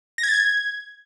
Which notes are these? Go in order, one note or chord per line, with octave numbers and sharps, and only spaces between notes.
A#6
G#6
A6
G#6